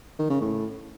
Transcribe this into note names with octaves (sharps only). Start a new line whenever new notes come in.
D#3
C#3
A2